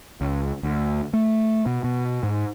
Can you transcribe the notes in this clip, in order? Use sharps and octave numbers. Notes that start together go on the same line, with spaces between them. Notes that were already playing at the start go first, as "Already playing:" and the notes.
C#2
D2
A3
B2
B2
G#2